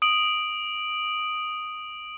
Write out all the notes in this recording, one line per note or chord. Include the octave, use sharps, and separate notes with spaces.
D#6 D7 F#7